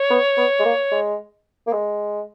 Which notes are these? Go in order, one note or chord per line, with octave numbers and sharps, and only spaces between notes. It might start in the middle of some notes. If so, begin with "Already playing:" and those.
Already playing: C#5
B3
B3
G#3
A#3
G#3
A#3
G#3